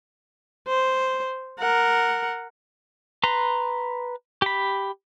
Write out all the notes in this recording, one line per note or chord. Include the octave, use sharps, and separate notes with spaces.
C5
A#4 F#5
B4 A#5 C6
G4 B5